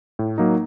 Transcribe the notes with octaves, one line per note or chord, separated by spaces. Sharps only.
A2
F#3 A#3 D#4